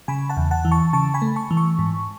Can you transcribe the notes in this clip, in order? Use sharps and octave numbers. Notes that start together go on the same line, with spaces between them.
C#3 G#5 B5
F#5 A5
E2
F#5 A5
E3
A5 C#6
C#3 A5 C#6
G#5 B5
A3
A5 C#6
E3
A5 C#6
G#2